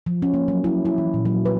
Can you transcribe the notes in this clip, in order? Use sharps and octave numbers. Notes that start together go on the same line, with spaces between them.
F3
C#4
A#3
F#3
E4
E4
E3
A#2
F#3
B4